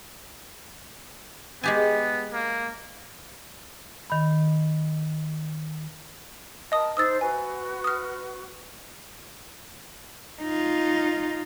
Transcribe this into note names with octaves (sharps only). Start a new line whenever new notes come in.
G#3 B3 G4 G#5
A#3
D#3 B5
A#4 D#5 A5 D#6
D#4 C5 D#6 E6 A6
F#4 B4 G#5
D#6 F6
D#4 F4